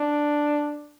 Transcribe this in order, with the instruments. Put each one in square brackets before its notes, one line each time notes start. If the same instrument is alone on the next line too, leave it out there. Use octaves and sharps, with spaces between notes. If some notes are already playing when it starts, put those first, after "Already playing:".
Already playing: [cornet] D4